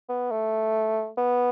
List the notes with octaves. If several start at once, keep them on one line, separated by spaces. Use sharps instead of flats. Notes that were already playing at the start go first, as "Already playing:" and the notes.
B3
A3
B3